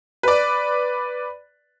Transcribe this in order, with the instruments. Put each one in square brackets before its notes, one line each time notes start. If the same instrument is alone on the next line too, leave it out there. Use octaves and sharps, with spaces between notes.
[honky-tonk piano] B4 D5